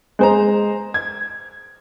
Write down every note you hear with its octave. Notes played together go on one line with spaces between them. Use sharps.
G#3 C5 A#5
G#6